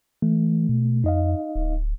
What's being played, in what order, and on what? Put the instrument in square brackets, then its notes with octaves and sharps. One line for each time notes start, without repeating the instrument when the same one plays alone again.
[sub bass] E3 [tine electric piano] A3
[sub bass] B2
[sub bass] F2 [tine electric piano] D#4 D#5 F5
[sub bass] D1